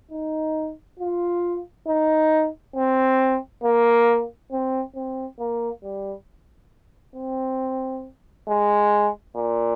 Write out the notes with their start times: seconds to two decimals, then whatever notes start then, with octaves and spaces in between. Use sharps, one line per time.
0.11 D#4
0.99 F4
1.88 D#4
2.76 C4
3.64 A#3
4.52 C4
4.95 C4
5.39 A#3
5.83 G3
7.15 C4
8.48 G#3
9.36 A#2